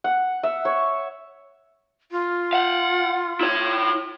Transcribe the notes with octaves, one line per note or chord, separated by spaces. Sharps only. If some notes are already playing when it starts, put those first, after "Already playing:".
F#5
E5
C#5
F4
F5 F#5
E4 C#5